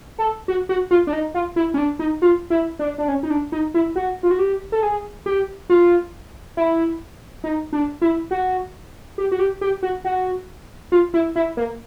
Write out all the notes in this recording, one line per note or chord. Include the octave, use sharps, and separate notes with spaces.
A4
F#4
F#4
F4
D4
D#4
F4
E4
C#4
D4
D#4
F4
E4
D4
D4
C#4
D#4
D4
D#4
E4
F#4
F4
F#4
G4
A4
G#4
G4
F4
E4
D#4
D4
E4
F#4
G4
F#4
G4
G4
F#4
F#4
F4
E4
E4
A#3